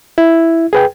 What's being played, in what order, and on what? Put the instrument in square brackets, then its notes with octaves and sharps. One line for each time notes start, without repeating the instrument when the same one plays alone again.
[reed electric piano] E4
G#4 B4 G5